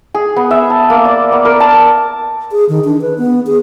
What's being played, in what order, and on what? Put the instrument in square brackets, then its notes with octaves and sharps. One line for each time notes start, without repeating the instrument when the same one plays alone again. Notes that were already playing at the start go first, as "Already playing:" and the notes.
[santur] G#4
B3
E5
A5
A#3
D5
B3
A#4
A5
[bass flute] G#4
D#3
D4
B4
B3
G#4